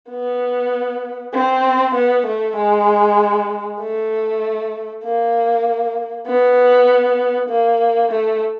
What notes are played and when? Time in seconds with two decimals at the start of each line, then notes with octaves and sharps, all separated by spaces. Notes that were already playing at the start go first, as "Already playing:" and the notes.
0.10 B3
1.34 C4
1.94 B3
2.26 A3
2.56 G#3
3.80 A3
5.04 A#3
6.27 B3
7.49 A#3
8.11 A3